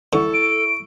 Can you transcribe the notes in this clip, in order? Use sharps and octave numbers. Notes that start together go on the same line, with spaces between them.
D3 E4 A4 C#6
D7